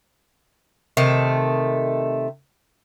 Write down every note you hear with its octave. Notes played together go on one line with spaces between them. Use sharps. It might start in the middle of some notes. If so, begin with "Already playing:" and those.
C3 D#3 A3